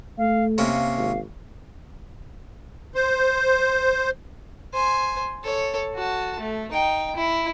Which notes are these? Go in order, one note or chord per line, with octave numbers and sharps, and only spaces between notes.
A3 F5
C3 A#3 C#4 F5
G#1
C5
C5 G#5
A4 C#5
F#4 A5
A3
D#4 G5
E4